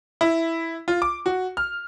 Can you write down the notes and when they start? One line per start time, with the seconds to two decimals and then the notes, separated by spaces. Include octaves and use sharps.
0.21 E4
0.88 F4
1.02 D6
1.26 F#4
1.57 F6